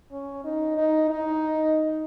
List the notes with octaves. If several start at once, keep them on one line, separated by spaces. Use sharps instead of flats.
C#4
D#4
D#4
D#4